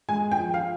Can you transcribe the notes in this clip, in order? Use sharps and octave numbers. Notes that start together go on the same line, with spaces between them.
G#3 G#5
G5
F3
F5